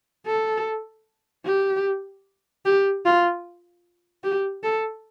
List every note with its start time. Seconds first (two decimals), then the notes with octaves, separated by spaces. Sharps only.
0.26 A4
1.45 G4
2.65 G4
3.05 F4
4.24 G4
4.63 A4